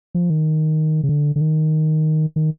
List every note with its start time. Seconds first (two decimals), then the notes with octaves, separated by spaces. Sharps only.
0.15 F3
0.30 D#3
1.03 C#3
1.09 D3
1.36 D3
1.41 D#3
2.36 D#3